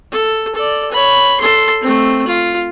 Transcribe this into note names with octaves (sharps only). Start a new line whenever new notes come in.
A4
A4 D5
C#5 B5
A4 C6
A3 C4
F4